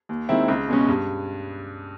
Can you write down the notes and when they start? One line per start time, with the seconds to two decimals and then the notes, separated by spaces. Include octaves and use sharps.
0.09 D#2
0.29 D#3 G#3 C4 E4
0.48 C#2
0.68 B2 G#3 C#4
0.88 G2